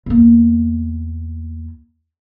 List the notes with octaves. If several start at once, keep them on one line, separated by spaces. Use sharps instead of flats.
E2 A#3